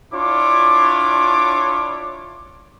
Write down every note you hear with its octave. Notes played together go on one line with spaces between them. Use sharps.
D4 E4 F4 C#5 D6